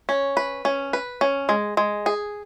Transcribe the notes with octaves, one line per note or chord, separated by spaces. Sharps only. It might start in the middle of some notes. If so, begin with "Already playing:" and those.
C#4
B4
C#4
B4
C#4
G#3
G#3
G#4